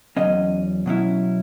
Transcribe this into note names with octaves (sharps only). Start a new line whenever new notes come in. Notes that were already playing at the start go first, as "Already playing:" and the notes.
E2 D#3 F#3 C#4 D#5
B2 F#3 C#4 E4